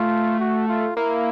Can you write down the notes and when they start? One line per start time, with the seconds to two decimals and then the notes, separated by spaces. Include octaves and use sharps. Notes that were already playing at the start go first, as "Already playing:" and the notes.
Already playing: A3 F4
0.40 F#4
0.69 F4
0.97 A#3 E4